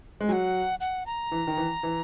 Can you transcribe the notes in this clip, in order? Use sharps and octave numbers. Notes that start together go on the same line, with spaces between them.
G#3
F#3 F#5 G#5
F#5
A#5
E3
D#3
E3
E3